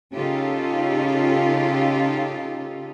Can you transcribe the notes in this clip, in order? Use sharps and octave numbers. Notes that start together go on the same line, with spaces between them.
C#3 C#4 D#4 F4 G4 A4